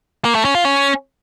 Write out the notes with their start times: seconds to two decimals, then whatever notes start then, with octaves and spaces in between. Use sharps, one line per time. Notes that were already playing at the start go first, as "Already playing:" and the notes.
0.25 A#3
0.35 A3
0.45 C#4
0.55 F4
0.65 C#4